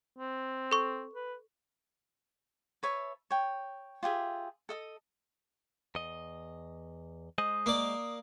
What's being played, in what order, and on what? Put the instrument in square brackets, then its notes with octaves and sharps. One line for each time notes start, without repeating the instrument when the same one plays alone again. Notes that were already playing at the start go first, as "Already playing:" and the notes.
[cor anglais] C4
[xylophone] A4 C#6
[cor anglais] B4
[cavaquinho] B4 C#5 E5 A5
C#5 G5
F4 G4 G#4 E5
A4 D#5 D#6
[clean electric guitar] E2 D#5
[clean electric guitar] G#3 C5 D#5 [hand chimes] D#6
[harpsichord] A#3 D5